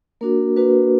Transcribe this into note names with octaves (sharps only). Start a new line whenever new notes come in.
A#3 D4 F#4 A#4
A#3 D4 F#4 B4